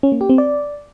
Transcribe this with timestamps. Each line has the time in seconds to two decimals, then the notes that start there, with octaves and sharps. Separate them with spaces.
0.03 C#4
0.12 A#3
0.21 G4
0.29 C4
0.38 D5